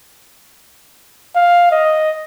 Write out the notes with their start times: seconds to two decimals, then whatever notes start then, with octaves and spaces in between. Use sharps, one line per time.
1.35 F5
1.71 D#5